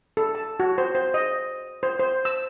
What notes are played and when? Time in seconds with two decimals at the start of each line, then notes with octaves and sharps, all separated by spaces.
0.17 A4
0.35 A5
0.60 F#4
0.78 C5
0.95 C5
1.14 D#5
1.83 C5
2.00 C5
2.25 E6